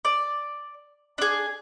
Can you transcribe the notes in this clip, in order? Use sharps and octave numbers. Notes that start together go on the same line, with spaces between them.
D5
D4 G#4